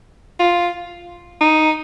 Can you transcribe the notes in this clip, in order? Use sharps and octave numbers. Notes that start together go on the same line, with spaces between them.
F4
D#4